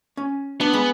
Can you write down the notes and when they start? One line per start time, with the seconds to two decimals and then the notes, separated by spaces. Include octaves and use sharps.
0.17 C#4
0.61 B3 D4
0.73 G#3 B5